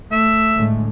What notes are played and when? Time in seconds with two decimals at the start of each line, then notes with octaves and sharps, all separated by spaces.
0.12 A3 E5
0.56 A2 D3 G#3